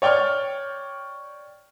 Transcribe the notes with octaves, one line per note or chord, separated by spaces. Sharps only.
C#5 D5 G5 C#6 F6